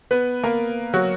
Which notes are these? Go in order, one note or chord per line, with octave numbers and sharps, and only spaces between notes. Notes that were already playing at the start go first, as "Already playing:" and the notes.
B3 B4
A#3 A#4
F#3 F#4